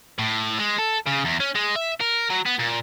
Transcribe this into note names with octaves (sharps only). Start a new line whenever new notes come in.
A2
G#3
A4
C#3
E2
C#4
G#3
E5
A#4
F#3
B3
A#2